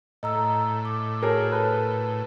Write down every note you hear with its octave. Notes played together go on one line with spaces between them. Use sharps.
A2 D#5 A#5 E6
D6
F#4 G#4 A#4 C#5 A5
A4 B4 A5